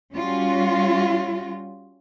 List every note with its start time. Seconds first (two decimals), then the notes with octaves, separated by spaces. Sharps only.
0.15 G3 C#4 F4 F#4